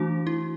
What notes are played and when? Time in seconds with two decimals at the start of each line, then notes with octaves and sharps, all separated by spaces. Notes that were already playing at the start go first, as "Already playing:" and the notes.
Already playing: E3 A3 D4 F#4
0.27 E4